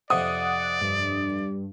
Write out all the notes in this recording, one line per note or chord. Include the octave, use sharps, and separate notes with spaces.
F2 C3 D5 F#5 D#6
G2